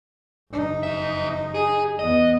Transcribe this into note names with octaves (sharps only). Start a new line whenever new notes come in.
F#1 D#4
F2 E5
G#4
E2 B3 D#5